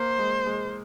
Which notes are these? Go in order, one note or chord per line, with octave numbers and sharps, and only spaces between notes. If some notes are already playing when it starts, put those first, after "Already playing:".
Already playing: A#3 C5
G#3
G#3